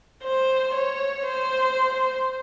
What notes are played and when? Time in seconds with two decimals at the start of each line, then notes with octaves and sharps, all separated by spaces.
0.23 C5
0.74 C#5
1.26 C5